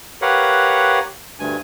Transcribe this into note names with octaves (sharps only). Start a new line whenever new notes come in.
G4 A#4 B4 C#5 F5 F#5
D2 G2 G#5